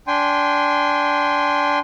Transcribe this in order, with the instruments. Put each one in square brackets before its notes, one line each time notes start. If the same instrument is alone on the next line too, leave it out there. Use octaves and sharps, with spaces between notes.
[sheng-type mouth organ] D4 G5 G#5 C6